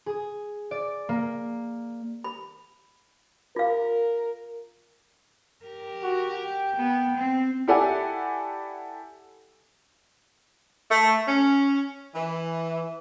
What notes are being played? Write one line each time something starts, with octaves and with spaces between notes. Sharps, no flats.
G#4
D5
A#3
B5
F4 A#4 F5
G4 A#4
F#4
G5
B3
C4
E4 G4 A4 D5 F#5 G#5
A3
C#4
E3